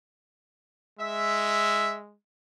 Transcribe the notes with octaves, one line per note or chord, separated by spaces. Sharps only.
G#3 E5